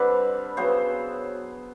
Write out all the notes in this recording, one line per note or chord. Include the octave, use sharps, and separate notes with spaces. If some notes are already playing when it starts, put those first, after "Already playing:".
Already playing: D3 G3 C4 B4
C#3 F#3 B3 C5